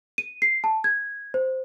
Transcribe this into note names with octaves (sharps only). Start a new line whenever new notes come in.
D#7
C7
A5
G#6
C5